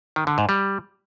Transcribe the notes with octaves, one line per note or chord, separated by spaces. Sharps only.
D#3
D3
G#2
G3